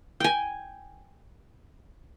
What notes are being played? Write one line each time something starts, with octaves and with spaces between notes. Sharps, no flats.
G5 G#5